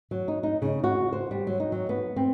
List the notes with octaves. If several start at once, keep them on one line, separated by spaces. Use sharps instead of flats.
F#3
D#4
D#4
C#3
F#4
C5
G3
F#3
D#4
F#3
B3
C4